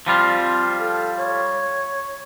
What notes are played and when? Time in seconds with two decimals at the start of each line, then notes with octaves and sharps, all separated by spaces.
0.07 F3 G3 C4 F4
0.80 A4
1.18 C#5